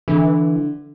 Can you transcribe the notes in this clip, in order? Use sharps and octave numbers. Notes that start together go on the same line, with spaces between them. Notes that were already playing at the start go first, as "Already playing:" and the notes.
D3 E3